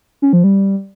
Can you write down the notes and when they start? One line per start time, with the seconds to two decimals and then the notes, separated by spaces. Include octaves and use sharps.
0.22 C#4
0.33 F3
0.44 G3